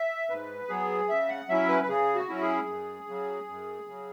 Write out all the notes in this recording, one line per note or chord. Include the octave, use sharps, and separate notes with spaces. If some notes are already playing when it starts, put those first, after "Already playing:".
Already playing: E5
G#2 B4
F#3 B3 G#4
C#3 E5
F#5
F#3 C#4 E4 E5
B4
B4
C#3 G#4
F#4
F#3 C#4 E4
G#4
F#2
C#3 F#3
F#2
C#3 F#3